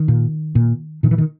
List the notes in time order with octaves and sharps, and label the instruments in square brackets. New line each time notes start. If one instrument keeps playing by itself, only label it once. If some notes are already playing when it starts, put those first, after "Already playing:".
Already playing: [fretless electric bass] D#3
A#2
A#2
A#2 D#3
E3
D#3